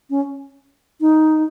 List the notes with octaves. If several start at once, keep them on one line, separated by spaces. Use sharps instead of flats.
C#4
D#4